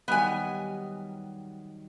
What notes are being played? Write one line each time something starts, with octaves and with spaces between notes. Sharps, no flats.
D#3 F#3 G3 B3 G#5